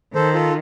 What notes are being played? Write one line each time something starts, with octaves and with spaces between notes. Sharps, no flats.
D#3 A4 C5
F4 A4